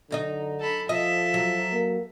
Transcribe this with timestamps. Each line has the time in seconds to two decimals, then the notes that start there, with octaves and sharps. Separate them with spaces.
0.11 F#2 D3 D#4 D#5
0.60 A4 B5
0.89 F3 A4 D#5 E5
1.34 F#3
1.73 A#3